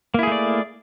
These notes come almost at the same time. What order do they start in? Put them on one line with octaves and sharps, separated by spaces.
A#3 E4 G#4 A3 D5